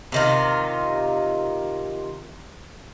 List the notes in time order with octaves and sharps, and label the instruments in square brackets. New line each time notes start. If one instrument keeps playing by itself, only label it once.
[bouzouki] C3 D#3 F4